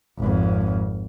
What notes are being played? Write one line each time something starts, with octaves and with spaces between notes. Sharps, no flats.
G#1 F2